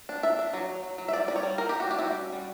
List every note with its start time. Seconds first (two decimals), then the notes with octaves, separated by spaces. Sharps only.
0.09 D4
0.23 D4 E5
0.39 D4
0.54 F#3
0.69 F#3
0.83 F#3
0.98 F#3
1.08 E5
1.13 G3 D5
1.28 G3 D5
1.36 C#5
1.43 G3
1.58 G3 A#4
1.69 G3 G4
1.80 F#4
1.88 D4 G4
1.99 E4
2.02 G3 F#4
2.17 C#4
2.33 G3